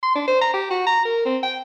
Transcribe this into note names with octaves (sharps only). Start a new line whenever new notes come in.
C6
D4
C5
A#5
G4
F#4
A#5
A#4
C4
G5